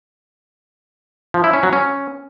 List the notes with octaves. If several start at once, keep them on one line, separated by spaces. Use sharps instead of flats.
F3
E4
C#4
F#3
C#4